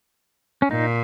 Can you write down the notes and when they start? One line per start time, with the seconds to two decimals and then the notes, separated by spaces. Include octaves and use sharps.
0.62 C#4
0.71 A#2 D#4